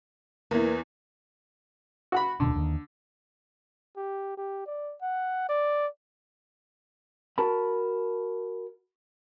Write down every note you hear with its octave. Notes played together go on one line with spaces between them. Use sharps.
E2 E3 A#3
F#4 F#5 B5
D1 D#2 B2 D3
D#2 D#3
G4
G4
D5
F#5
D5
F#4 A#4 A5 B5